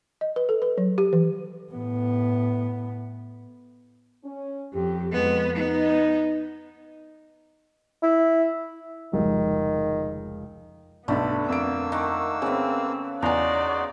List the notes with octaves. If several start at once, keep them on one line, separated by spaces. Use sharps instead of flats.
D#5
B4
A4
B4
F#3
G4
E3
A2 B3
C#4
F2 G4
F2 G#3 B3
B3 D#4
E4
F1 C#2 D#3
B1 G2 D3 A3 B3 B5
F2 A#3 E6 D7
D#3 F#5
C#3 B3 C4 G#4
E2 D#4 F#4 D5 G#5 A#5 C6